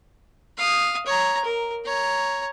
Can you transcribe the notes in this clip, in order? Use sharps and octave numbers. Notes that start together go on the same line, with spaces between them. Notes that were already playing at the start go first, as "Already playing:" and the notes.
F5 D#6
C#5 A#5
A#4
C#5 A#5